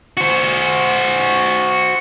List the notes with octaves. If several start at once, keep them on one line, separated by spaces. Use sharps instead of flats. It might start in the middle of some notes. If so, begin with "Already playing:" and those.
F#4 C5